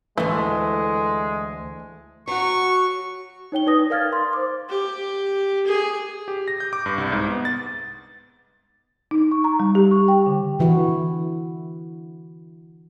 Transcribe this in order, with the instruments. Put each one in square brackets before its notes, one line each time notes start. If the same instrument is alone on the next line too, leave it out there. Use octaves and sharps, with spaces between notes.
[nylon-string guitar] D2 A3 [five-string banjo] E3 [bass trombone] G#3
[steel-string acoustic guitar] F#3 F#4 [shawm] C#6
[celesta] D#4 C#5 G5 G7
D#4 B4 D5 D#6 A#6
A#4 D5 F5 F6 G#6 A6
C6
C5 D6
[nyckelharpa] G4
G#4
[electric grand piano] G4
A#6
G6
D6
G2
C2
G#2
B3
A6
[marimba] D#4
C#6
A#5
G3
G4
C#6
G5
D3
[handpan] D3 E3 E4 F#4